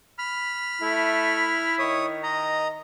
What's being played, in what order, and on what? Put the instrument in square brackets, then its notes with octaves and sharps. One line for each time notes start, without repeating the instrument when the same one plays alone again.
[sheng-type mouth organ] B5 F6
[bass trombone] A3 [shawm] E4
[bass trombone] D#3 [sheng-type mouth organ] C#5 D#6
[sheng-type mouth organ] D#5 A#5